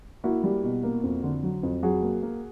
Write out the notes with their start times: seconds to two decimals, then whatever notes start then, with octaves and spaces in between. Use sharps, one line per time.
0.24 A#3 E4 F#4
0.44 G3
0.64 B2
0.83 A#3
1.03 F2
1.23 D3
1.43 F#3
1.63 F2
1.83 F#3 F#4 G#4
2.03 A#3
2.22 A#3